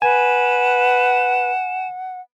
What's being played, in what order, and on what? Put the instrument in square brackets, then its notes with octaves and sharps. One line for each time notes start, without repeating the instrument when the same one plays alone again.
[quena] B4 [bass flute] F#5 [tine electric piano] G#5 [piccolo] E7